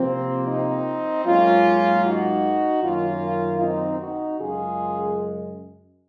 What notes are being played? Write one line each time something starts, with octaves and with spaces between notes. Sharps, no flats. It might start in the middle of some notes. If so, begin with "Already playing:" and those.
Already playing: C3 F3 A#3 C4
C4 D#4
G#2 F#3 A#3 C#4 F4
D#4 F#4
F#2 D#3 A#3 C#4 F4
C4 D#4
D#4 F#4
F#2 C#3 G#3 F4 G#4